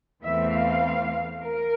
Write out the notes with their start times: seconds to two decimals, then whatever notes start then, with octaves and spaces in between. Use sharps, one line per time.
0.23 E2 E3 A3 C4 E5
0.52 F5
1.44 A#4